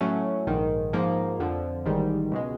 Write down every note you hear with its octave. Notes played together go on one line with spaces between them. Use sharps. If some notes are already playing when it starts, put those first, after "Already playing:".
A2 F#3 A3 C#4
A#1 G#2 D#3
G#2 F3 A#3
F2 D3 F3
A1 G#2 D#3 G3
C#2 B2 G#3